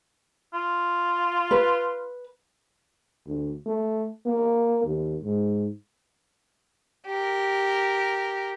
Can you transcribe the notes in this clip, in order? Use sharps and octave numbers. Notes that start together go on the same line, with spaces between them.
F4
B4
D2
A3
A#3
D#2
G#2
G4 A#4